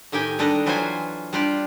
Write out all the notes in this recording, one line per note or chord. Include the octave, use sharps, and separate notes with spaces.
A2 D#3 G4 G5 G#5
D#3 G3 D4 A4 B4 D#5
E3 F#3 F4 C5 F#5 G#5
G3 D4 F4 G4 D5